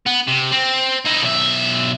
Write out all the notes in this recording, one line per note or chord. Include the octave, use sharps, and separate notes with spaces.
B3
C3
C4
D#4 E4
B1 E5